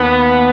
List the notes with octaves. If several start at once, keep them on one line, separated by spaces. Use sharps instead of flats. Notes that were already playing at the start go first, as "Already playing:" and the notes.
Already playing: D#2 B3